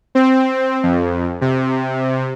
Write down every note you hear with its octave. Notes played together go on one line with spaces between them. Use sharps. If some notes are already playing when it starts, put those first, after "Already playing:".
C4
F2
C3